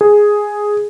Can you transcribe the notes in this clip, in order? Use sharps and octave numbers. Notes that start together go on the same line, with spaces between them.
G#4